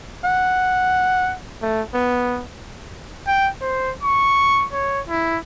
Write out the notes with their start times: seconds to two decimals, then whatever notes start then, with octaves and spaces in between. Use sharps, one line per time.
0.25 F#5
1.62 A3
1.94 B3
3.27 G5
3.62 C5
4.03 C#6
4.73 C#5
5.09 E4